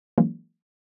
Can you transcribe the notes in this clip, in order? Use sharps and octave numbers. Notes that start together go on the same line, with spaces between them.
E3 F#3 G#3 A#3 C#4 D#4